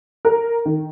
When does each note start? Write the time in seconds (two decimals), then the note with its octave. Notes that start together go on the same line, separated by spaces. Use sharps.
0.25 A#4
0.66 D#3